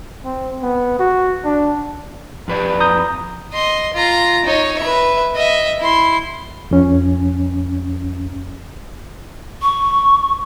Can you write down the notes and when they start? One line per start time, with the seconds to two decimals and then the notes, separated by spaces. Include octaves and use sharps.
0.25 C4
0.62 B3
0.99 F#4
1.44 D4
2.48 F2 B4 D5
2.80 A#5 D#6 G6
3.53 D#5 C6
3.94 F4 A#5
4.45 D#4 C#5
4.78 B4 E5
5.35 D#5 E5
5.79 E4 C6
6.71 F2 C#4
9.62 C#6